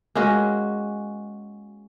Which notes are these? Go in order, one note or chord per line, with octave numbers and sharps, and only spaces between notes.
G#3 A#3 C#4 F#4